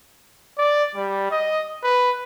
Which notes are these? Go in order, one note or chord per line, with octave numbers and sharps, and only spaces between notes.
D5
G3
D#5
B4